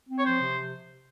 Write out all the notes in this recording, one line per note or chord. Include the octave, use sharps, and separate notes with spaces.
C4
C#5
F3 C5
C3